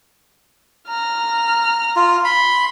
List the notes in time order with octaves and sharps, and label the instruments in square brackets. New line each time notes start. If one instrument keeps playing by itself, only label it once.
[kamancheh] A#5 F6
[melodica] F4
[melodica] B5 [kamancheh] C6